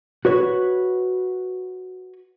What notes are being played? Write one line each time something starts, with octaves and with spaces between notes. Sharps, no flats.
F#4 B4 C#5